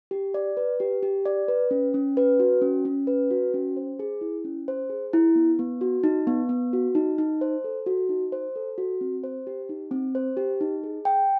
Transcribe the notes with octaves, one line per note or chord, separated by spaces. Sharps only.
G4
D5
B4
G4
G4
D5
B4
C#4
C#4
B4
F#4
C#4
C#4
B4
F#4
C#4
C5
G#4
E4
C#4
C5
G#4
E4
B3
B3
F#4
D#4
B3
B3
F#4
D#4
D#4
C5
A4
F#4
D#4
C5
A4
F#4
C4
C5
G4
D#4
C4
C5
G4
D#4
G#4
G5